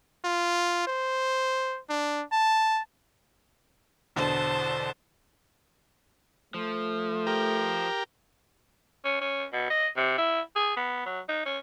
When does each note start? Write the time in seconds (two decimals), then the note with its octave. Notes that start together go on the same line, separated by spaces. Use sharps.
0.25 F4
0.87 C5
1.89 D4
2.32 A5
4.16 E2 B2 D3 C5 A5
6.54 F3 A3
7.27 G4 A#4
9.05 C#4
9.21 C#4
9.53 B2
9.70 D#5
9.97 C3
10.18 E4
10.56 G#4
10.76 B3
11.06 F#3
11.29 D#4
11.46 C#4